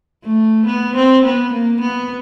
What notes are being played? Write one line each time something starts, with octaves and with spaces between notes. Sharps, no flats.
A3
B3
C4
B3
A#3
B3